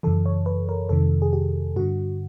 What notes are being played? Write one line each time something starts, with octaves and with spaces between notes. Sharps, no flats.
F#2 C#3 E3 A4
C#5
B4
A#4
F2 C3 D#3 A4
G#4
G4
G2 D3 F#4